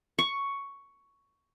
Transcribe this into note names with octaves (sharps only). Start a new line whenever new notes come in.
C#6